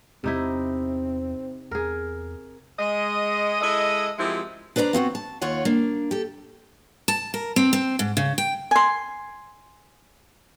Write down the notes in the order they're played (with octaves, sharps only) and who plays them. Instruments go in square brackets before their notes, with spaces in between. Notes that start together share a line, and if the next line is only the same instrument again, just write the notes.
[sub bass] E2 [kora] C3 D#4 E4 [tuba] C4
[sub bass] E2 [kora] G#4 A#4
[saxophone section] G#3 D#5
G#3 E4 A4 D#5
F#2 F3 G#3 C4 E4 G4
[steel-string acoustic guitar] D4 B4 C5 D5 A#5
B3 C4 F4 F#4
A5
D#2 F4 C#5 F#5
A#3 D4
G4 A4
A5
A#4
C4
C4
G#2
C#3
G5
[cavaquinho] G#5 C6